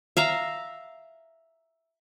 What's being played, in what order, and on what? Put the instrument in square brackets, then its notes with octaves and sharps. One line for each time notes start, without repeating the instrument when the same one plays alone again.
[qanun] E5 F5 A#5